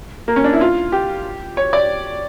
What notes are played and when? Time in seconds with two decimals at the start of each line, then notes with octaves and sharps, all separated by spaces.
0.28 A#3
0.36 C#4
0.44 D4
0.53 E4
0.61 F4
0.92 G4
1.57 C#5
1.73 D5